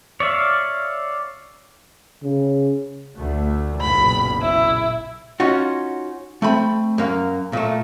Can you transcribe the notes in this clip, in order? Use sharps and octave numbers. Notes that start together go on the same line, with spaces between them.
C#5 D5 E5 F5
C#3
D2 A3
F#1 B1 A#2 B5
E4
C#4 D#4 F4 F#4
A3 C4 B5
F#2 A#3
A#2 A3